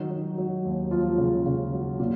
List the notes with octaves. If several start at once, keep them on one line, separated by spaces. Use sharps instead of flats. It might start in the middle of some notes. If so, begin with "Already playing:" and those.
Already playing: D#3 F#3 D#4
F#3
F#3
D#2
D#2 F3 F4
C#3
C#3
F#3
A#2